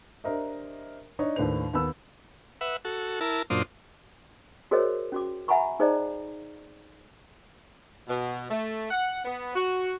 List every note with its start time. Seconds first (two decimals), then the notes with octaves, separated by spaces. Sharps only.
0.24 D4 G4 A#4 C5 D#5 E5
1.19 D4 D#4 C#5 D#5
1.36 D#2 A2 D4 B4 C5 F7
1.73 D#2 B3 B5 E6
2.61 B4 E5 F#5
2.85 F#4 A4
3.21 E4 A#4 A5
3.50 F#2 A#2 D4 F4 C5 D#6
4.71 F#4 G#4 A#4 C5 C#5 D#5
5.12 C#4 F#4 D6
5.48 E5 F#5 G#5 A#5 B5 C#6
5.80 D#4 G#4 C5 D5 D#5 A#5
8.08 B2
8.50 A3
8.91 F#5
9.24 B3
9.55 F#4